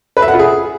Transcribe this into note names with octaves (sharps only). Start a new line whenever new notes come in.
B4
E5
F#5
F4
G#4